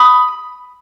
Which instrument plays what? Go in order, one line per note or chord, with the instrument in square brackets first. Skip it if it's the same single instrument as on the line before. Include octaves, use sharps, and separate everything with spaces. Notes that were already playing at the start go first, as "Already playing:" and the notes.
Already playing: [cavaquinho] B5 D#6